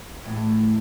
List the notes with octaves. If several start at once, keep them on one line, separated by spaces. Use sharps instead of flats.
E2 A2